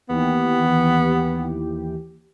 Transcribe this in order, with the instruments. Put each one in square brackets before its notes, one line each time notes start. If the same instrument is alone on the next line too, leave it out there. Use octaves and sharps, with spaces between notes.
[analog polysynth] D#2 E3 G4 [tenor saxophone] B3